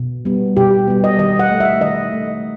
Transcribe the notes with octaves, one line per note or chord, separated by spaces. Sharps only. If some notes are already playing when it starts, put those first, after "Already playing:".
Already playing: B2
G3 B3
B2 G4
G3 B3
D#5
D#3 D#5
F#5
A3
E5
D#3 D#5
A3